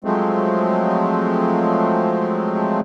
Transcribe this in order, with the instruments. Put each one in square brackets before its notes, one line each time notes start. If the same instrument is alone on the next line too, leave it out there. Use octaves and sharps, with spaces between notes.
[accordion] F3 F#3 G#3 A3 C4